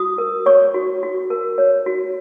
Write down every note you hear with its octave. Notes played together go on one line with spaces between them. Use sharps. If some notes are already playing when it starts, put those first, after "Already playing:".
Already playing: F#4 D#6
A#4
C#5 C#6
F#4
F#4
A#4
C#5
F#4